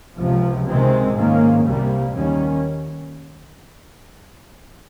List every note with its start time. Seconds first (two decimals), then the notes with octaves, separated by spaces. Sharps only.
0.16 C#2 C3 F3
0.66 C3 D#3 G#3 C4
1.15 G#2 D#3 A#3 C#4
1.65 C2 C3 G3 A#3
2.14 D#2 D#3 G3 C#4